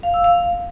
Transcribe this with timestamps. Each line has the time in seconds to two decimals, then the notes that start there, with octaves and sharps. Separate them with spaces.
0.03 F5
0.14 E6
0.24 F5